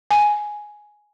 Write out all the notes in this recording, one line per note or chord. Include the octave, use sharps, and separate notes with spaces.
G#5